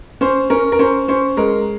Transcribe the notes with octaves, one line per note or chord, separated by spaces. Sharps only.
C#4 C5
C#4 A#4
A#4
C#4 C5
C#4 C5
G#3 A#4